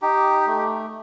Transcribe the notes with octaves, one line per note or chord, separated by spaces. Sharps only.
D#4 G4
A3